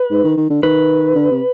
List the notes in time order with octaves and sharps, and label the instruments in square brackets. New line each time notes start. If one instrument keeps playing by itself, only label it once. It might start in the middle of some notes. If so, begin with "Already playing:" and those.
Already playing: [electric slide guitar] B4
[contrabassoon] G#2
D#3
D#3
D3
[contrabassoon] D#3 [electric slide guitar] B4
[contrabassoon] D3
C3